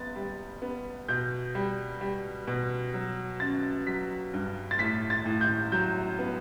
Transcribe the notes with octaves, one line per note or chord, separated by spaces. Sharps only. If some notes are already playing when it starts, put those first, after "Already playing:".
Already playing: B3 A6
G3
B3
B2 G6
G3
G3
B2
F#3
C#4 A6
F#3 B6
G2
A6
A2 B6
A6
A2
G6
F#3 G6
B3